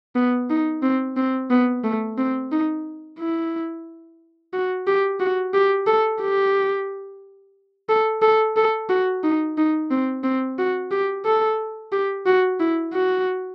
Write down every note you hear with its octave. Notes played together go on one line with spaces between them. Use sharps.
B3
D#4
C4
C4
B3
A3
C4
D#4
E4
F#4
G4
F#4
G4
A4
G4
A4
A4
A4
F#4
D#4
D#4
C4
C4
F#4
G4
A4
G4
F#4
E4
F#4